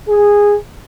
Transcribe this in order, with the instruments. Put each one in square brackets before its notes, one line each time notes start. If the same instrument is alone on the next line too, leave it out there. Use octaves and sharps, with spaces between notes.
[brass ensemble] G#4